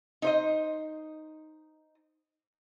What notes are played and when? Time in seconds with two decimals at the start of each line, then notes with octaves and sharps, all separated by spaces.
0.22 D#4 C5 D#5